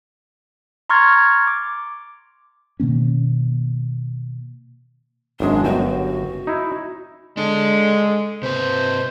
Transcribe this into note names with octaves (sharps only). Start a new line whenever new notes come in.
A#5 C6 C#6 F6 G#6 A6
D6
B2 D#3 A#3 C#4
G#1 F#2 G#3 D4
G1 F#2 F#4 G5
D#4 E4
G#3 D4 A4
C3 B4 C5